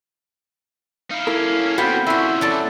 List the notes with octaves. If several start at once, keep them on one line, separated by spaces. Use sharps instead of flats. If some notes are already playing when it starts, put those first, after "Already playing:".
D#4 E4 F5
A#3 C#4 E4 A4 A#4
B3 C4 F#4 A4 B4 F5 G5
A#2 C#3 E4 F#4 C5 E5
F#3 A4 D5